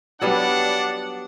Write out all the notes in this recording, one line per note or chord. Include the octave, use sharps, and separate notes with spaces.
F#3 G3 B3 D4 D5 F#5